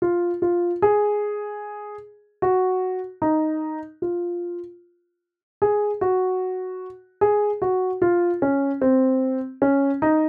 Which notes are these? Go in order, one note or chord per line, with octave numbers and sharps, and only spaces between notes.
F4
F4
G#4
F#4
D#4
F4
G#4
F#4
G#4
F#4
F4
C#4
C4
C#4
D#4